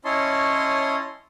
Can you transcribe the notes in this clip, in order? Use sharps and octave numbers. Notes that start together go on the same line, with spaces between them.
C#4 E4 C#5 D#5 A5 C6